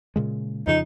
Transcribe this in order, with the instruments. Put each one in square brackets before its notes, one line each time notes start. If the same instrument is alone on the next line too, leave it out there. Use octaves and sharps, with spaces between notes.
[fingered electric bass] A#2 C#3 G#3
[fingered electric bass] F2 C#3 F3 [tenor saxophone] D#4